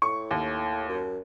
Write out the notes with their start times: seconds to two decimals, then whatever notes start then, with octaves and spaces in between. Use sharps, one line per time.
0.02 A2 C#6
0.31 D#2
0.88 F#2